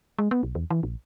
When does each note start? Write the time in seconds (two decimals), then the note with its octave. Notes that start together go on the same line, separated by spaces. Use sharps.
0.19 G#3
0.31 B3
0.43 B1
0.55 E2
0.70 E3
0.83 A#1